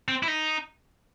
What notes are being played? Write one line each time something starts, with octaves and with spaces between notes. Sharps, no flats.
C4
E4
D#4